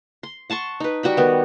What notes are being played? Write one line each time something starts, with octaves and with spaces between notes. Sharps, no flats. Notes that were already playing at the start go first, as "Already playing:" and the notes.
C6
F#5 A5 C6 C#6
D#4 B4
G3 F#4 G5 B5
D#3 B3